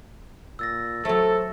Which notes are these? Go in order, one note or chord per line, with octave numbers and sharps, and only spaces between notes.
A#2 E6 A6 A#6
F#3 A3 A4 C5